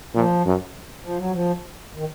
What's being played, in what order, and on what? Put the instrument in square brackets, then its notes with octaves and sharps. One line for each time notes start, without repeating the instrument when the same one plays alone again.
[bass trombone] A#2 [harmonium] F3
[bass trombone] F#2
[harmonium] F3
F#3
F3
D#3